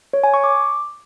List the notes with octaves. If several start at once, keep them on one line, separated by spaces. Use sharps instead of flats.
C#5
G#5
C#6
D6